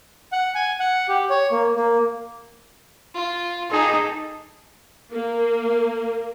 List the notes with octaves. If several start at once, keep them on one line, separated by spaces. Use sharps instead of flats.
F#5
G#5
F#5
G4
C#5
A#3
A#3
F4
D#4 G#4 A4
A#3